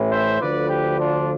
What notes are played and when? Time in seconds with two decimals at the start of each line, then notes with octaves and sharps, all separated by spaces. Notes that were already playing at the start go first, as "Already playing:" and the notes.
Already playing: A1 A2 E3
0.10 C5 E5
0.40 D2 D3 F3 B4 D5
0.69 G4 B4
0.98 D4 F4